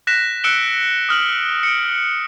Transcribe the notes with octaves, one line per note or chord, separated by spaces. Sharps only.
F#6 A#6 B6 E7
E6 F#6 C#7 D7 E7 G7
D#6 F6 F#7
C#7 D7